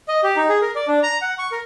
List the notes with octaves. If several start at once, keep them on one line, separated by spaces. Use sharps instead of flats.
D#5
G4
D#4
G#4
A#4
D5
D4
A#5
F#5
C#6
A#4